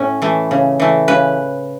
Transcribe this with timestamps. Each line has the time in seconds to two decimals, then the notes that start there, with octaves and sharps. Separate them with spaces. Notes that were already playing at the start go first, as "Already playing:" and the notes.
Already playing: A2 C#4
0.22 E3 A3
0.51 C#3
0.80 E3 A3
1.08 C#3 B4